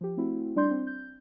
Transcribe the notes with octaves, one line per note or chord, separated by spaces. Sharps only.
F3 G4
A3 C4 E4 F#4
G3 D4 D5 C6 G6
C4
G6